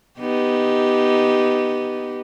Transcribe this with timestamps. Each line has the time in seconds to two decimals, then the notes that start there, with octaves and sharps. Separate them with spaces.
0.20 B3 D#4 G4